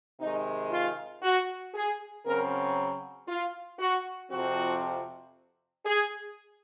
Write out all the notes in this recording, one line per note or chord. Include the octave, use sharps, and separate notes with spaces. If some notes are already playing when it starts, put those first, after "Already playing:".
C3 D#3 G#3 D#4
F4
F#4
G#4
C#3 F#3 C4 A#4
F4
F#4
F2 C3 F3 C4 F#4
G#4